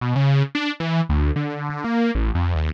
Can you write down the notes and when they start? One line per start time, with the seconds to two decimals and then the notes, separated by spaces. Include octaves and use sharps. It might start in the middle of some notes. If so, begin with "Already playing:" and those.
0.01 B2
0.16 C#3
0.55 D4
0.80 E3
1.09 D2
1.36 D3
1.70 D3
1.84 A#3
2.15 A1
2.35 F2
2.55 D#2